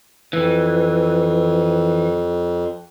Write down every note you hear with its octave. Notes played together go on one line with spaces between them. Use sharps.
F2 E3